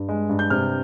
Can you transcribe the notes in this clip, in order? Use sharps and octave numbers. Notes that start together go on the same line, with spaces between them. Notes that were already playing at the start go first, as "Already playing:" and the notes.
Already playing: G2
G#3
G2
G6
C3 F6